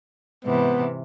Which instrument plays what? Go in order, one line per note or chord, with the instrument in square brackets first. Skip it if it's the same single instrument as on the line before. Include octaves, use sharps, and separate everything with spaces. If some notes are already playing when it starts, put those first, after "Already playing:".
[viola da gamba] G#2 C3 E3 [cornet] B3 [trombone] B4